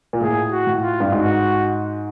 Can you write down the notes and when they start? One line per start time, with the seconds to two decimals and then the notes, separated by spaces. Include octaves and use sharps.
0.13 A#2
0.21 A2 G#4
0.51 F#4
0.67 A2
0.82 F4
1.00 G2
1.12 G#2 F#4